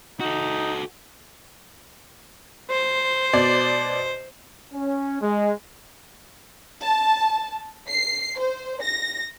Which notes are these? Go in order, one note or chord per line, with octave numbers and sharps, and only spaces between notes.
D#4 F#4 A4
C5
B2 D5
C#4
G#3
A5
C7
C5
A#6